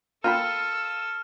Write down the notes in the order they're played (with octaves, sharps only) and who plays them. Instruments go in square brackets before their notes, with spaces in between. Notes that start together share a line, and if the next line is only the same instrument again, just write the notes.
[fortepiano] F4 [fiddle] A4 E6 [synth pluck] A#4 G5 B5 [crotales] F6 D#7